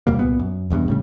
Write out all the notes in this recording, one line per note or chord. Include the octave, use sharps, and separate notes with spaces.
D#2 B2 G3 A#3
C2 G2 A#2 B3
F#2
E1 E2 G2 B2
A2 C#3 G3